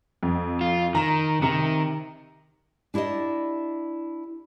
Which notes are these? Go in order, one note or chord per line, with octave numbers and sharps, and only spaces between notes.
F2
F4
D#3 A#5
C3 D#3 A#5 C#7
D4 E4 G4 D5 D#5